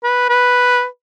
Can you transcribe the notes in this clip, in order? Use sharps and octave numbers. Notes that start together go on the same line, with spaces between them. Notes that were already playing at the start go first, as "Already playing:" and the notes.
B4
B4